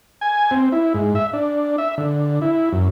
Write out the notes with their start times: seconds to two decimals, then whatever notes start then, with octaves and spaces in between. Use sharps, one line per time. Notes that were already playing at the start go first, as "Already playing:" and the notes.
0.21 G#5
0.51 C4
0.72 E4
0.94 G#2
1.15 E5
1.33 D4
1.78 E5
1.98 D3
2.42 E4
2.72 F#2